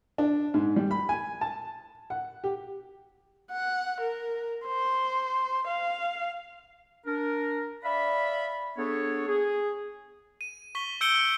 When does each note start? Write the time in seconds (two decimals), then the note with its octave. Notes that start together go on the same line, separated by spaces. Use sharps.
0.18 D4
0.54 G#2
0.76 G3
0.91 B5
1.09 G#5
1.41 A5
2.10 F#5
2.44 G4
3.51 F#5
4.01 A#4
4.66 C5
5.67 F5
7.06 D4 A#4
7.83 D5 E5 F5 B5
8.77 B3 D4 G#4 A4 C#5
9.28 G#4
10.41 D#7
10.75 C#6 B6 G7
11.01 E6 G6 C#7 D7 F#7 G7